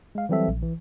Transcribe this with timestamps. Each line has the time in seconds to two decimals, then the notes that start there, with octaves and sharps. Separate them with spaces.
0.15 G#3 F5
0.29 E3 F#3 G3 C4 A4 E5
0.48 A#1
0.63 E3